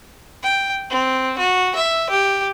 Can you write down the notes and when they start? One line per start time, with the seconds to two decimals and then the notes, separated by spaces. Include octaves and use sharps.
0.43 G5
0.90 C4
1.38 F#4
1.75 E5
2.10 G4